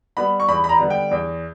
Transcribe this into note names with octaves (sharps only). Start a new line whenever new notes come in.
G3 B3 B5
C#6
E2 B5
B5
A#5
D3 G3 B3
G5
E2